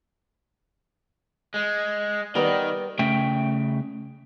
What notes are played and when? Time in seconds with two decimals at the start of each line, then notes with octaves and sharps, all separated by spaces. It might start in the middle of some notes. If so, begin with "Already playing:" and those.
1.54 G#3
2.35 D#3 G3 B3 A#4 D5
2.99 C#3 A3 E5 G5